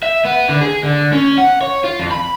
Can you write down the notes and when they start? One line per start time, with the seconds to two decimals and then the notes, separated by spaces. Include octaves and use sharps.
0.03 E5
0.25 B3
0.49 D3
0.61 G#4
0.83 D3
1.13 C#4
1.38 F#5
1.61 C#5
1.84 F4
1.99 F2
2.11 B5